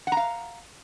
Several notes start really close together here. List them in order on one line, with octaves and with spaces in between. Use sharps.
F#5 A#5 F5